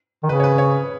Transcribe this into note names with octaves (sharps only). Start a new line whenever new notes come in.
D#3
C#3 B4
C#5
B4
C#5